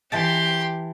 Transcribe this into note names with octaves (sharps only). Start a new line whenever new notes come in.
E3 G4 G5 A5 C6